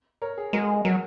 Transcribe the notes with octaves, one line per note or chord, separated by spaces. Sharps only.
A#4 C#5
G#4
G#3 F#4 A#4
G#4
G#4
F#3 F#4 A#4